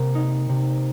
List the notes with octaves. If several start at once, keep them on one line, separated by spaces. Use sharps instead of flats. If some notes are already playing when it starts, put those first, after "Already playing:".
Already playing: C3 A#3
D#4
C3